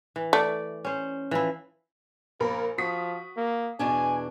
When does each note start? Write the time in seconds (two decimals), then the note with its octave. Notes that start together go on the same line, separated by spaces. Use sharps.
0.16 E3
0.33 A3 D5
0.85 C#4 C5
1.31 E3 F3 E4
2.40 A#1 A#3 A#4 B5
2.78 F3 F#4 D#6 B6
3.37 A#3
3.79 E2 B2 D4 G#5